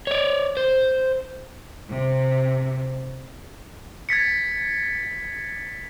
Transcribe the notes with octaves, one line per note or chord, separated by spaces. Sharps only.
C#5 D5
C5
C3
G#6 A6 B6 C#7